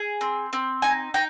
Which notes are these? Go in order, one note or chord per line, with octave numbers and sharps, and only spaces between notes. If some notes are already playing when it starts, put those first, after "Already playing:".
Already playing: G#4
C4
C4
D#4 G#5
D#4 G5